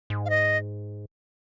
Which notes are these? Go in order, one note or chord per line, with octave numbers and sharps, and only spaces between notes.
G#2
F5
D#5